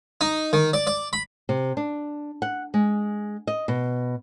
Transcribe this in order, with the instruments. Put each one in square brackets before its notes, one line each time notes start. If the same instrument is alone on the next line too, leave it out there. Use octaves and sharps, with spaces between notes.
[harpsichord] D#4
D#3
D5
D5
B5
[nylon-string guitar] C3
D4
F#5
G#3
D#5
B2